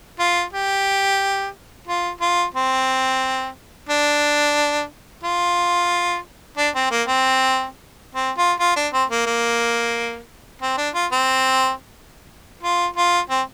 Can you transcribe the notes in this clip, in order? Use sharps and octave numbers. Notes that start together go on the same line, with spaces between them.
F4
G4
F4
F4
C4
D4
F4
D4
C4
A#3
C4
C4
F4
F4
D4
C4
A#3
A#3
C4
D4
F4
C4
F4
F4
C4